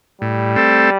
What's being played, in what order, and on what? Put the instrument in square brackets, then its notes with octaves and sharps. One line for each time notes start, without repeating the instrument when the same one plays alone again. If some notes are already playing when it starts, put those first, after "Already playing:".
[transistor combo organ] A2 [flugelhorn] G3
[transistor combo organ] A3 C4 A4